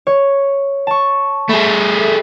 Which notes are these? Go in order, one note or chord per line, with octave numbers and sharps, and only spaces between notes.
C#5
A5 C#6
A3 G#4 B5